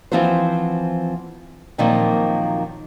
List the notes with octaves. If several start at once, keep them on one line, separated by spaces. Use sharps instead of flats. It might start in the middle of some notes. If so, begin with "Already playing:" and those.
E3 F3 C4 E4 F#4 C5
A#2 D#3 F3 F#3 A#3 C4